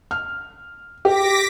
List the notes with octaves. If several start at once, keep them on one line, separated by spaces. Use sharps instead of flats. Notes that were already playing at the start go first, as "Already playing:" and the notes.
F6
G4 D6 A#6 B6